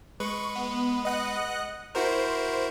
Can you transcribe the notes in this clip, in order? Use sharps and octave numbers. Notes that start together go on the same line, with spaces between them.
G#3 B4 C#6
B3
D#5 F#5 F#6
E4 F#4 A#4 C5